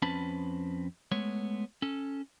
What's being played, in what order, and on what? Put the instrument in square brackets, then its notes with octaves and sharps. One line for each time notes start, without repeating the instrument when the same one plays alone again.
[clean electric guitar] F2 C4 C#4 B4 A5 B5
G#3 A3 B3 C#5
C#4 A4